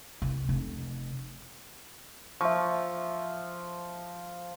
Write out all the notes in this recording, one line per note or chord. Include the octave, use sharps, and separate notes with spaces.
C2
F1
F3 E5 C#6